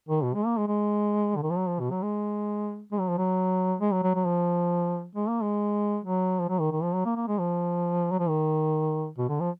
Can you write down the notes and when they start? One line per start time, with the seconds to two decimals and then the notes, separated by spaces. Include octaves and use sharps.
0.09 D#3
0.23 B2
0.34 G#3
0.45 A#3
0.57 G#3
0.68 G#3
1.36 D3
1.43 D#3
1.50 F3
1.58 F#3
1.68 F3
1.80 B2
1.91 F#3
2.03 G#3
2.92 G#3
3.00 F#3
3.09 F3
3.18 F#3
3.81 G#3
3.92 F#3
4.03 F#3
4.15 F#3
4.26 F3
5.15 G#3
5.28 A#3
5.42 G#3
6.05 F#3
6.40 F3
6.49 F#3
6.60 D#3
6.72 D#3
6.83 F3
6.94 F#3
7.05 A#3
7.16 A#3
7.27 G#3
7.39 F3
8.11 F#3
8.19 F3
8.29 D#3
9.18 B2
9.29 D3
9.40 F3